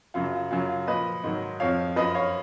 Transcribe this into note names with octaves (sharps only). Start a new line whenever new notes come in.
F#2 C#3 F#3 F4
F4
F#2 C#3 F#3 F4
F4
A#2 F3 B4 D#5
G#2 D#3 F#3
F2 F3 C#5 F5
F#2 F3 B4 D#5
C#5 F5